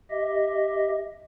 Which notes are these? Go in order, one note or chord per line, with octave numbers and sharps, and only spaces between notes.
G4 D#5 E5